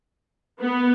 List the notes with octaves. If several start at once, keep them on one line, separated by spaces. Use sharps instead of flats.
B3